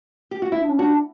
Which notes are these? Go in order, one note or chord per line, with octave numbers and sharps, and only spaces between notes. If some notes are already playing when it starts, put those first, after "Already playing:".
G4
F#4
E4
D4
C#4
D4 F#4